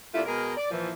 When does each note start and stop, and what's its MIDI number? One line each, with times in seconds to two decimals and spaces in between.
0.14 0.23 48
0.14 0.23 57
0.14 0.23 58
0.14 0.23 62
0.14 0.23 64
0.14 0.23 65
0.26 0.52 47
0.26 0.52 56
0.26 0.52 68
0.26 0.52 70
0.57 0.70 74
0.71 0.92 46
0.71 0.92 52
0.71 0.92 53